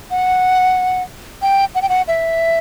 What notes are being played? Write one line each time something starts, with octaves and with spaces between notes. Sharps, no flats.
F#5
G5
F#5
G5
F#5
E5